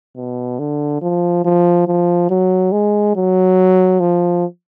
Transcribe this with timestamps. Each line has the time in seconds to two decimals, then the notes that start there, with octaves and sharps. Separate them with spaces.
0.17 B2
0.59 D3
1.02 F3
1.45 F3
1.88 F3
2.30 F#3
2.72 G#3
3.16 F#3
4.00 F3